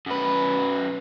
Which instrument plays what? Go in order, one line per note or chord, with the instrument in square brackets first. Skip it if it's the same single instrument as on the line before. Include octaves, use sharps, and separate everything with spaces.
[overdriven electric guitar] F#2 B4